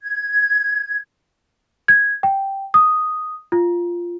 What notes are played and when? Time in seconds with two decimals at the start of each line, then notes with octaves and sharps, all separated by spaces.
0.02 G#6
1.88 G#6
2.23 G5
2.74 D#6
3.52 F4